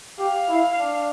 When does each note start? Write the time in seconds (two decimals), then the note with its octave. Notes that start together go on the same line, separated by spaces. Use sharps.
0.19 G4 F5
0.49 E4
0.78 D4